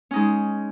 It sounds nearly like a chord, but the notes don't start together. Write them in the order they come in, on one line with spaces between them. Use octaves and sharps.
C#4 D#4 G#3